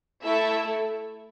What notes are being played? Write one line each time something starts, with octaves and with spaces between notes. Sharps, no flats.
A3 E4 A4 E5